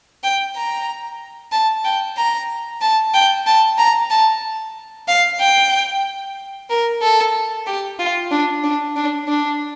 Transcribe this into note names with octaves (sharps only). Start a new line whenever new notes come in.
G5
A#5
A5
G5
A#5
A5
G5
A5
A#5
A5
F5
G5
A#4
A4
G4
F4
D4
D4
D4
D4